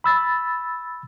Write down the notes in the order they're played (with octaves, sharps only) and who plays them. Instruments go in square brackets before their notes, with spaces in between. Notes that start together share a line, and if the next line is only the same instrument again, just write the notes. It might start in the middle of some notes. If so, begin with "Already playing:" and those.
[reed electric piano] B5 E6 A6